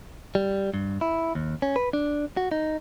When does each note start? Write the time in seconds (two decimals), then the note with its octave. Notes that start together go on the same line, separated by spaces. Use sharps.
0.35 G3
0.74 G2
1.01 E4
1.35 D#2
1.62 C#4
1.76 B4
1.93 D4
2.37 F#4
2.52 D#4